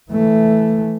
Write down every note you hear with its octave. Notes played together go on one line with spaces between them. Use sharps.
E3 A3